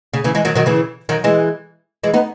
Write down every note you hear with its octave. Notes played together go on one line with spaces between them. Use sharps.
C#3
C#3 E3
E3 G#3
D#3 F#3
D#3 F#3
C#3 E3
D#3 F#3
E3 G#3
E3 G#3
B3 D#4